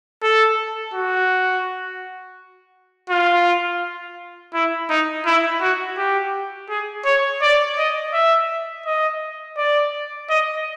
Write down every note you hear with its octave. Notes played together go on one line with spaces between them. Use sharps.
A4
F#4
F4
E4
D#4
E4
F#4
G4
G#4
C#5
D5
D#5
E5
D#5
D5
D#5